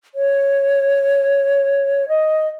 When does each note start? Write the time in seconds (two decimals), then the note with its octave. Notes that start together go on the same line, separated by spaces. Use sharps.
0.15 C#5
2.08 D#5